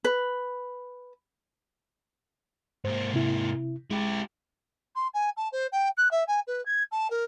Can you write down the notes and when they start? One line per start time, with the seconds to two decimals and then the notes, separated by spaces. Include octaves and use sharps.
0.04 B4
2.85 G#2 A#3 C5
3.14 C3 E4
3.91 G#3 E4 G4
4.95 C6
5.13 G#5
5.36 A5
5.52 C5
5.72 G5
5.97 F#6
6.11 E5
6.27 G#5
6.47 B4
6.65 G#6
6.91 A5
7.10 A#4